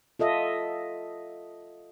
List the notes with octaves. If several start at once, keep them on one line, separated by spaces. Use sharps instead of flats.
F4 A4 D#5 E5